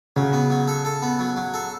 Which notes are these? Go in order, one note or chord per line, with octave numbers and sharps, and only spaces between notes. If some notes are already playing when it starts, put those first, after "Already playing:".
C#3 F#3
B3
F#3
A4
A4
B3
F#3
F#3
A4